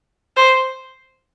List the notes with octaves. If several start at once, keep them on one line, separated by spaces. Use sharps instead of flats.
C5